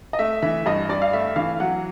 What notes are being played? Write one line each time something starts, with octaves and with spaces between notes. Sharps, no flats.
D#5
A3 E5
E3 E5
G2 D#5
G2 D5
F5
A3 E5
E3 F5
F#3 F#5